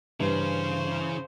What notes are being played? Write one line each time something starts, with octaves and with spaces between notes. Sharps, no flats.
G2 C#3 E3 C5